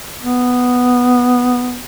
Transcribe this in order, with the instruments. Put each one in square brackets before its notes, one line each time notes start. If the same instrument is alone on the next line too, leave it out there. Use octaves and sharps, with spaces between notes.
[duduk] B3